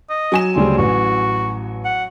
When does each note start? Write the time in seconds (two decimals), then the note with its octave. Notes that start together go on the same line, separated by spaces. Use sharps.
0.10 D#5
0.32 F#3 G#5 E7
0.56 D2 C#3 G3 C4
0.78 A1 F#4
1.85 F#5